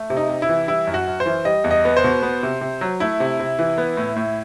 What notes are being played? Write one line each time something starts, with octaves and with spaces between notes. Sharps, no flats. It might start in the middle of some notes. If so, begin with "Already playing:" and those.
Already playing: A3
C3
D#4
C3
E4
E3
G3 E4
F#2
F#4
F#2
C5
E3
G3 D#5
E2
D#5
B3
C5
B2
B3
C3
C3
F#3
A3 E4
C3
C3
E3
B3
A2
A2